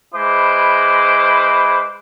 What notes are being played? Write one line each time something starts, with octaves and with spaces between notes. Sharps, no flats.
G#3 E4 B4 C5 B5 D6